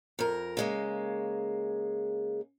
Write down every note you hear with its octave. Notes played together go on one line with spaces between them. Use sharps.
F2 A#4
C#3 G#3 A#3